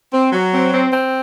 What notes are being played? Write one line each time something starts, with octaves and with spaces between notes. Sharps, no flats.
C4
F#3
C4
C4
C4